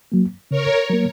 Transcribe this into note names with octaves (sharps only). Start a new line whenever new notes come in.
F#3 A#3
C#3 A#4 C#5
F#3 A#3